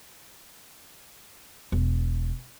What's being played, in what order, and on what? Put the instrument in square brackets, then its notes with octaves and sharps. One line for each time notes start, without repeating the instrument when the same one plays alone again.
[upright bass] E1